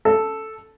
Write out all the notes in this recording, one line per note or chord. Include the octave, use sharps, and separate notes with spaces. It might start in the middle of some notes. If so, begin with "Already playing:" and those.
A4